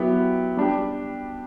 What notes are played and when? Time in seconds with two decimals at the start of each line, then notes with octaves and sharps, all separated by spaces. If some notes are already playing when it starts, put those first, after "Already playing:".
Already playing: F#3 B3 E4 G4
0.57 G3 D4 G4